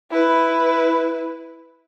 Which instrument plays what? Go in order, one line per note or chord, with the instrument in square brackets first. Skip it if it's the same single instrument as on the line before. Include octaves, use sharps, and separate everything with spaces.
[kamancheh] E4 B4